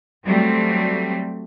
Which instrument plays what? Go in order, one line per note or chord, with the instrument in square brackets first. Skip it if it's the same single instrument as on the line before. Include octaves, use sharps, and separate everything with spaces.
[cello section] F#3 G3 A3 C4